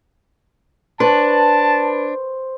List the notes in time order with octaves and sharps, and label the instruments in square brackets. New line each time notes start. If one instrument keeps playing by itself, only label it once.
[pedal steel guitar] D4 [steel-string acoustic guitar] B4 [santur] C5 C#6 [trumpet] A5